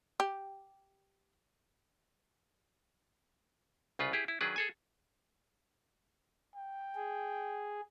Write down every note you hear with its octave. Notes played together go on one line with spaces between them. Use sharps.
G4
C2 C#3 F4 B4
E4 G4 G#4
E4
D#3 F#3 D4 G#4 B4
G#4 A4 G#5
G5
G#4